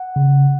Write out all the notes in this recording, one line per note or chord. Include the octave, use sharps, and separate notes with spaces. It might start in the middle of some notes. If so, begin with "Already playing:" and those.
Already playing: F#5
C#3